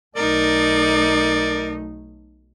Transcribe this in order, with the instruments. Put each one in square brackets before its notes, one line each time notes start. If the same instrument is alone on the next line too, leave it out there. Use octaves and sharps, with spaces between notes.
[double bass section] B1 A3 [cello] D#4 [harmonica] A#4 D5